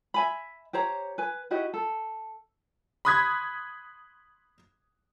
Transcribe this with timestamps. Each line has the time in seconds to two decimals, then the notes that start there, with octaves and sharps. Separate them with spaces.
0.14 E5 G#5 B5
0.73 G4 C5 C#5 A#5
1.18 B4 G#5
1.51 E4 F#4 G4 D#5
1.74 A4
3.05 B5 C6 D#6 F#6 G#6 B6